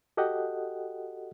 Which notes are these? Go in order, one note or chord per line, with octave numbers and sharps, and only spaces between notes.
F#4 G4 A4 D#5 F#5 G5